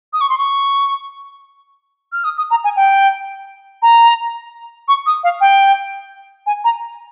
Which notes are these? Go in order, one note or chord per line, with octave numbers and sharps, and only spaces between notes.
D#6
C#6
C6
C#6
F6
D#6
D#6
A#5
G#5
G5
A#5
C#6
D#6
F5
G5
G#5
A#5